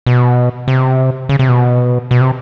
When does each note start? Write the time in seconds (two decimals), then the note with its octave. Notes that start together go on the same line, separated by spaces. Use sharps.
0.07 B2
0.68 C3
1.29 C#3
1.39 C3
1.49 B2
2.11 B2
2.21 C3